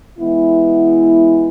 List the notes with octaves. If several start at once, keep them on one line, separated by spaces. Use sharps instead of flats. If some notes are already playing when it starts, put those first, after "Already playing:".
E3 G#3 B3 E4